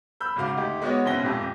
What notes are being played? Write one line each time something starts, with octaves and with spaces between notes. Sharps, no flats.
B5 E6 G6
G#1 C#3 F#4 F5 D6
D2 D#4 G4
G#3 B3 F#4 C#5 D#5
F#1 B2 C4 C#4 A#6 G7
D#1 G#1 F2 G4